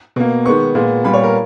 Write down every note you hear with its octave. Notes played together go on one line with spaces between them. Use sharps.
B2 A#3
D#3 G#3 B3 C#6
A#2 G#3 B3
A#2 G3 B3 B5
C#5
A#4